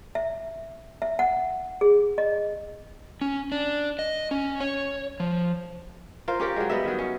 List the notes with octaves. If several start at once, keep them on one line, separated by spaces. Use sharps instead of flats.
E5
E5
F#5
G#4
D#5
C#4
D4
D#5
C#4
C#5
F3
F4 A#4 C5
C#4 G4 A#4 D5
F#3 G#3
G3 B3 D#5 E5
D#3 F#3
C#4